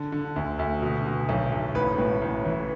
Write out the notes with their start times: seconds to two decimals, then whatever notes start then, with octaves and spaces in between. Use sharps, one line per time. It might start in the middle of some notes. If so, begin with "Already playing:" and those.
Already playing: D3
0.12 D3
0.36 D2
0.59 D2
0.82 B2
1.06 B2
1.29 B1
1.52 B1
1.75 A1 B4
1.98 A2
2.22 A1
2.45 E3